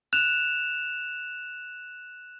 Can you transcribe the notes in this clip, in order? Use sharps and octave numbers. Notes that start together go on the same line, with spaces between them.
F#6 E7 F7